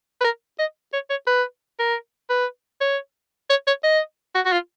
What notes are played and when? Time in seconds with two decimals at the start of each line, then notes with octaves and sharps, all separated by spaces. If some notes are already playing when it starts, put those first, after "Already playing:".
0.21 B4
0.24 A#4
0.59 D#5
0.93 C#5
1.10 C#5
1.27 B4
1.79 A#4
2.30 B4
2.81 C#5
3.50 C#5
3.67 C#5
3.84 D#5
4.35 F#4
4.45 F#4
4.52 F4